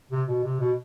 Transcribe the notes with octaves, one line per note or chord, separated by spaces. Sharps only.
C3
B2
C3
B2